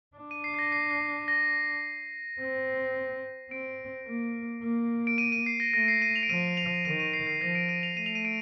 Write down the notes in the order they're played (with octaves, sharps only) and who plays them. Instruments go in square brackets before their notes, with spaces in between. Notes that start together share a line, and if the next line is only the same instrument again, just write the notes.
[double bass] D4
[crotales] D#7
C7
C7
A#6
C7
C7
A#6
[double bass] C4
[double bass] C4 [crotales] D7
[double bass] A#3
A#3
[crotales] D7
D#7
D#7
C7
A#6
[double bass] A3 [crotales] A#6
[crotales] C7
D#7
F7
D7
[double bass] F3 [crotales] D#7
[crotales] F7
[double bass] D#3 [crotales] D#7
[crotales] D#7
C7
C7
[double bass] F3 [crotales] A#6
[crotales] D7
D#7
F7
[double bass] A3 [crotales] D#7
[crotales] F7
D#7
D7